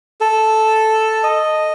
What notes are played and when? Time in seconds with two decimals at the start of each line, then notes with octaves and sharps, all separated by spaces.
0.21 A4
1.23 D#5